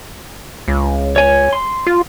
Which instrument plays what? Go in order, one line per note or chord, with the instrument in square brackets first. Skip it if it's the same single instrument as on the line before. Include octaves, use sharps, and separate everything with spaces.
[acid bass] C#2
[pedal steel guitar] C#5 G#5
C6
[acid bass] F4